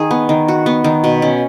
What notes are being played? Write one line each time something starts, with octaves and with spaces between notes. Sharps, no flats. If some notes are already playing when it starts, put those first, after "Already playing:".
Already playing: D#3 D#4 G#4
B3
D#3
F#4
B3
D#3
B2
C#4